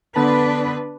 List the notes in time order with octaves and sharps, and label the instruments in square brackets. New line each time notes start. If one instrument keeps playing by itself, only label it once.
[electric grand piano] D3 B3 A5 [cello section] D4 B4